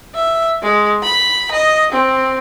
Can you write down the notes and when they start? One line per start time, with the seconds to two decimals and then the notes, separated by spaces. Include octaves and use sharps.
0.15 E5
0.62 G#3
1.03 B5
1.52 D#5
1.93 C4